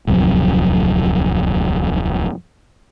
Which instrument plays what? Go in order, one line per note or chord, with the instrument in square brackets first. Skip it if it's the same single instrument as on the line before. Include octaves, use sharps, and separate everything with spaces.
[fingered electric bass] D1 C2 F2 F#3